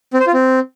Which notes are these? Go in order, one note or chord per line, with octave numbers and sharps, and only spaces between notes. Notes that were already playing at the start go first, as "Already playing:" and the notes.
C4
C5
F4
C4